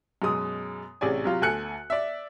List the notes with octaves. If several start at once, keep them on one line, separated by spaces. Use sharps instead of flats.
F#2 B2 G#3 D#6
A1 C3 C#4 G#4 D5 G#5
C3 F#3 F4
D2 A4 G#5 F#6 C#7
D5 E5